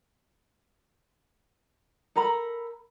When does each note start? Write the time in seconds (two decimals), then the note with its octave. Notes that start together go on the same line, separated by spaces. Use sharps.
2.16 A4 A#4 A#5 B5